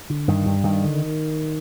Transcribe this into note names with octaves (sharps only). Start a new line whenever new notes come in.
D3
G2 D#3
G2
G2 D#3
D3